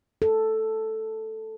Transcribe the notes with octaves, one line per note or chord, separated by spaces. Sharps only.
A4